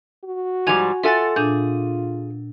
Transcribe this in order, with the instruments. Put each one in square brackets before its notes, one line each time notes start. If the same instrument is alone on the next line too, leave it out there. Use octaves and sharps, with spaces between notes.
[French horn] F#4
[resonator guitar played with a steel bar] G#2 F3 G3 [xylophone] G#5 G#6 F7
[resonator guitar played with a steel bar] F4 A4 F#5 [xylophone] E5 G#5 A6
[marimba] A#2 D4 G6 [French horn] F4 [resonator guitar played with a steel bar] G#4